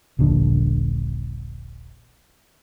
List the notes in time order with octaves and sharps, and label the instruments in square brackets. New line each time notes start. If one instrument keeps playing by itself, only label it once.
[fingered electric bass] D#1 A#1 D3